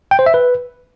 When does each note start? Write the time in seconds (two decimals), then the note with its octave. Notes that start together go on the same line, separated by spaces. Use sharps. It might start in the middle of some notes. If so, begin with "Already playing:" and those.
0.11 G5
0.19 C5
0.26 E5
0.34 B4